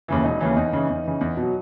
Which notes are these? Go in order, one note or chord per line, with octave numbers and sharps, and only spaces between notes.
D#2 C#3 E3
E1 D#4
D#2 C#3 E3 C#4
E2 D#4
C#3 E3
E2
C#3 E3
E2
B2
F#3